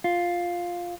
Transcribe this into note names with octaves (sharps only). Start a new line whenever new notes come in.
F4